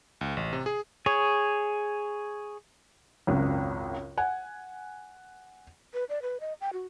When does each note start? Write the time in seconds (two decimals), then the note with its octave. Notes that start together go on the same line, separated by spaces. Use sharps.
0.21 C#2
0.37 A1
0.53 C3
0.66 G#4
1.06 G#4 C#5
3.27 G#1 C#2 F#2
4.18 F#5 G#5
5.94 B4
6.09 D5
6.22 B4
6.41 D#5
6.61 G5
6.73 F#4